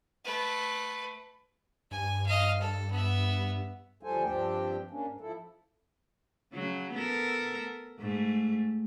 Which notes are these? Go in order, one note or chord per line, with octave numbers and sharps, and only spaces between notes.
A3 B4
G2 G#5
D#5 F5
A4
B3 E5
D2 F3 G3 A4 C5 G#5
G2 F3 C4 D4 G4 G5
A#3 C#4 D4
G#2
F3 E4 A4
C#3 F#3
B3 A4 A#4
G#2 A3